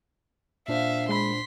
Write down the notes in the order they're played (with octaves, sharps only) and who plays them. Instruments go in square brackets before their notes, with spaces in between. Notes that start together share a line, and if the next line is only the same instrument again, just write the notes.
[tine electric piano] A#2 D4 C5 [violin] E5 F5
[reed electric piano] G#3 B5 [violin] C6 B6